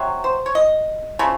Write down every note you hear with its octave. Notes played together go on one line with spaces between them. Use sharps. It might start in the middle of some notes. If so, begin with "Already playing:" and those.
Already playing: C3 F#3
C5
C#5
D#5
C#3 F3 A3